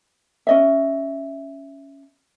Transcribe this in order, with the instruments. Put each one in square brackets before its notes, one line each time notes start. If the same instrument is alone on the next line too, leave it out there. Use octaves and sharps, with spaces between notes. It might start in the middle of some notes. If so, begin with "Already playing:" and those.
[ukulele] C#4 D#5 E5